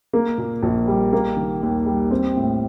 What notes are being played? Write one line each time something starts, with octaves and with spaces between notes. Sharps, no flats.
A#3
A#2
A#1
G3
A#3
D#3
D#2
G3
C4
A2